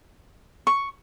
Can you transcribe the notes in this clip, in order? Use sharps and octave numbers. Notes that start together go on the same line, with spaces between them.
C#6